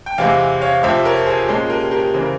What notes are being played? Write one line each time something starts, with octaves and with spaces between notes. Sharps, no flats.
G5
E2 C3 E3 G#3 C4 F5 G#5
C#5 F5
F2 C3 F3 C5 E5
A#4 C#5
G#4 C5
A#2 G#3 C#4 G#4
G4 A#4
G4 A#4
C#3 E3 C5
A#4